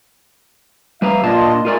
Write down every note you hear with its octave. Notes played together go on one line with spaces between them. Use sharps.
G3 B4 E5 F5 A#5
A#2 D4 F4 D#5 A5
G#3 A3 F4 A#4 D5